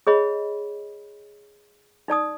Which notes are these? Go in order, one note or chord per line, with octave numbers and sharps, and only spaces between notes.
G#4 C#5 D#5 B5
D#4 D5 A5 D#6